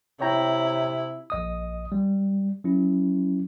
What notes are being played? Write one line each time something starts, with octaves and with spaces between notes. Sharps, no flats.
C3 E4 C#5 G5 A#5
A#1 D#5 D#6
G3
F#3 C#4 E4